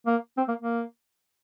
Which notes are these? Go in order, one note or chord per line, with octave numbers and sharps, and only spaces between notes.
A#3
C4
A#3
A#3